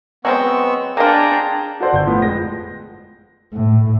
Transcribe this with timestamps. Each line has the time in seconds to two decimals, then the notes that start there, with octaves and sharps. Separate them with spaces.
0.25 F#3 G#3 B3 C4 C#6 E6
0.97 A#3 D4 F4 G#4 G5 A#5
1.80 F#4 A4 C5 D5 F#5
1.93 G1 G6
2.07 A2 F3 B3
2.22 F2 G#3 A#6
3.53 A2